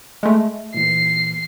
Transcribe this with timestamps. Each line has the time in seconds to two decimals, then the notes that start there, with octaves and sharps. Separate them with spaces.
0.23 G#3 A3
0.74 A#2 E3 C7